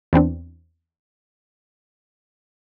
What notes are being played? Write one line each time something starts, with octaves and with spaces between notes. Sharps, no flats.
E2 E3 C4 D4